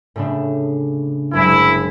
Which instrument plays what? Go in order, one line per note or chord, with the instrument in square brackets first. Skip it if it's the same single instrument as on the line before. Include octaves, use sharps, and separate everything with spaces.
[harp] A2 C#3 D4
[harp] F#1 C2 G#3 [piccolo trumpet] E4